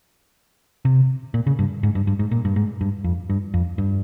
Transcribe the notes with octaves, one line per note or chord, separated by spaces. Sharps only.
C3
A#2
C#3
G2
G#2
G2
G2
G#2
A#2
G2
G#2
G2
F2
G2
F2
G2